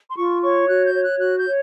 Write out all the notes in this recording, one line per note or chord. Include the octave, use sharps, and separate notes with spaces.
C6
F4 C#6
C#5 C#6
F#4 F#6
G6
C#5
F#6
F#4 F#6
G6
C#5